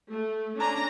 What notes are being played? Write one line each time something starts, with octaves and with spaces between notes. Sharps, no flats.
A3
C#4 D4 A#5